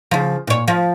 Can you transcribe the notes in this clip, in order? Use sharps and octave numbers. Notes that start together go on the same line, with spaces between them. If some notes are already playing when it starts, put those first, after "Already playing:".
C#3 F3
A#2 C#5
F3